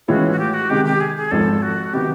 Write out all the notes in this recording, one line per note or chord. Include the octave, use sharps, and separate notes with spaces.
A2 E3 G#3 C#4 F4 F#4
F#4
G4
F#4
C3 D#3 G#3 G4
G4
G#4
G#4
G#1 G#2 F3 A4
F#4
C3 D#3 F#3 B3 G4